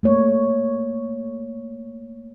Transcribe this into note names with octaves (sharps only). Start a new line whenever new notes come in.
A3 A#3 C#5 D5